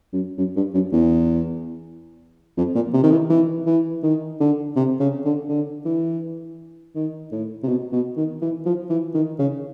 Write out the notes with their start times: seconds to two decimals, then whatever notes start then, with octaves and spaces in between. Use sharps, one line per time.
0.13 F#2
0.38 F#2
0.56 G2
0.74 F#2
0.92 E2
2.57 F2
2.75 A#2
2.93 C3
3.03 D#3
3.11 E3
3.30 E3
3.66 E3
4.03 D#3
4.40 D3
4.76 C3
5.00 C#3
5.25 D3
5.49 D3
5.85 E3
6.95 D#3
7.32 A2
7.63 C3
7.68 B2
7.92 B2
8.17 D#3
8.42 E3
8.66 F3
8.90 E3
9.14 D#3
9.39 C#3